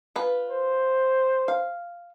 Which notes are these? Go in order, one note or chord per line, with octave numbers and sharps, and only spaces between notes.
F4 B4
C5
F5